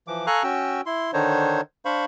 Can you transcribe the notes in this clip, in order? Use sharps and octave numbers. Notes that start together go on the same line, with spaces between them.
E3 F3 D6
A4 F5 G#5 A#5 C#6 F#6
C#4 F#4 G5 E6
E4 C6
D3 D#3 D4 D#4 C5 C#5
D4 C5 F5 B5 C#6